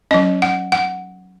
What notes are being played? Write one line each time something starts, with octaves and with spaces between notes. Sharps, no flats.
F#3 C#4 D#5
F#5
F#5